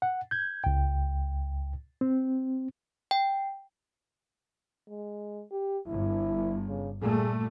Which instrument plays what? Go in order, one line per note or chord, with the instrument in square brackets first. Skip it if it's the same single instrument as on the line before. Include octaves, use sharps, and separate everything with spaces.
[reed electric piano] F#5
G6 G#6
C#2 G5
C4
[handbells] G5
[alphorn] G#3
G4
[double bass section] G1 G2 [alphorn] E4
[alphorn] C#3
[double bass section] A#2 G3 A3 [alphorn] G#4